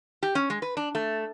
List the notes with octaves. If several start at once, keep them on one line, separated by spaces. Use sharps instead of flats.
G4
C#4
G#3
B4
D4
A3